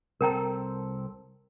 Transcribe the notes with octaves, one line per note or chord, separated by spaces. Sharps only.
C2 C4 A4 A#4 G5 A#5